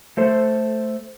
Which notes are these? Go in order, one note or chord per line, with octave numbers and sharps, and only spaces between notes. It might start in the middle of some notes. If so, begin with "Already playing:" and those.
A3 A4 C5